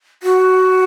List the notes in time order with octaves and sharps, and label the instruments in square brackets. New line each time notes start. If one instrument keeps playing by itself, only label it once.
[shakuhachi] F#4